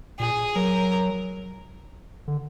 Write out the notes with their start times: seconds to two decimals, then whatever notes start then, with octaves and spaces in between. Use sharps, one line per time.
0.19 A#2 G#4
0.55 F#3 A#4
2.28 D3